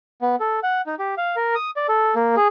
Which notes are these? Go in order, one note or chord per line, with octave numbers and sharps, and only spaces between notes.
B3
A4
F#5
D#4
G4
F5
A#4
D#6
D5
A4
A#3
G#4